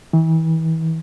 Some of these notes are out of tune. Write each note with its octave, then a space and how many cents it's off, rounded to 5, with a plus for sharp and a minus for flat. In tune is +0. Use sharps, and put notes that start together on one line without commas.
E3 -35